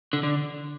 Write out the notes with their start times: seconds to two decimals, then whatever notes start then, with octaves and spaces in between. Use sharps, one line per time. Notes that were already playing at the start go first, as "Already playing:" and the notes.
0.13 D3
0.23 D3